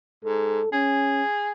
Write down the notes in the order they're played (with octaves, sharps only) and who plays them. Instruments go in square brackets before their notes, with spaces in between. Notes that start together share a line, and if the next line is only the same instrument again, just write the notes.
[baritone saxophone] G#2 [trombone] A4
[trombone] C#4 [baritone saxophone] G#4